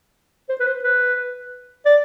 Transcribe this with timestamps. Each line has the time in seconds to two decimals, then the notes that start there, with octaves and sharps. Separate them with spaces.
0.49 C5
0.60 B4
0.67 C5
0.84 B4
1.85 D5